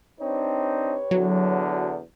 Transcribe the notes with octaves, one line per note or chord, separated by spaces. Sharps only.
C4 D4 D#4 G4 B4 C#5
E2 D3 F#3